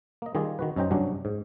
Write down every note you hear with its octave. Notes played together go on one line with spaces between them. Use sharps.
A#3 D#5
D#3 G3 F4 G#4 D5
D#3 F#4 B4
F#2 C#4 D#4 C5 G5 A#5
G2 C3 F#3 C#4 D4
G#2